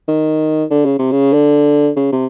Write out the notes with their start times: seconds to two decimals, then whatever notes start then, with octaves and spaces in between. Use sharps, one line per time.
0.08 D#3
0.71 D3
0.85 C#3
0.99 C3
1.12 C#3
1.33 D3
1.96 C#3
2.12 C3